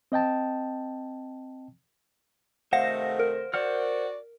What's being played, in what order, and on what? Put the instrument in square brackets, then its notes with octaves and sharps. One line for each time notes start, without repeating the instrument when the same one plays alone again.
[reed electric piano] C4 D#5 G5 A5
[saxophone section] C3 D#3 A3 [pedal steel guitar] C5 [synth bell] F5 F#5 A#6
[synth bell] A#4
[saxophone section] F#4 D5 [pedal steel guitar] C5 F#5 F6